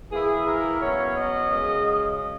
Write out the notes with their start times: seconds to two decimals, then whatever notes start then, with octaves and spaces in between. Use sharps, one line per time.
0.11 E3 A#3 E4 G#4
0.46 A#4
0.81 B2 F#3 C#4 C#5
1.15 D#5
1.50 F#2 C#3 G#3